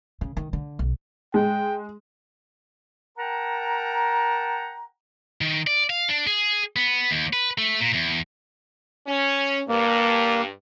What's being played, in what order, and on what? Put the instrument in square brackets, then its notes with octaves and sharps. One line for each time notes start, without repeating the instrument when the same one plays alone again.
[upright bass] C#3
D#3
D3
B1
[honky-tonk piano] G#3 [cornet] G5
[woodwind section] A#4 F#5 G5 A5 A#5
[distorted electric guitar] D#3
D5
F5
D4
G#4
B3
D#2
B4
A3
A#2
E2
[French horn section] C#4
[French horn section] G2 [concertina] A#3